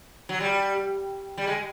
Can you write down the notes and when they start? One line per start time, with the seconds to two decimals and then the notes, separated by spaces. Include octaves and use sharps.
0.29 F#3
0.40 G3
1.38 G3
1.47 G#3